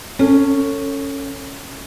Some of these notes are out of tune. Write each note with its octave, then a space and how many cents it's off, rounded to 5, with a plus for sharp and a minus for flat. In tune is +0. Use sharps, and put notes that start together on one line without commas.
C#4 +0 A4 +25